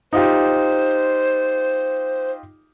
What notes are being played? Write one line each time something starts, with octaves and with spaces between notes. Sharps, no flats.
D#4 F4 G4 C5